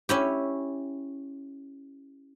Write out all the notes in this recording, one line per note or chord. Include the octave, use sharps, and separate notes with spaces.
C#4 E4 G4